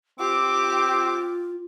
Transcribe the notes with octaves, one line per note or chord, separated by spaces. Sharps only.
C4 F4 G4 D6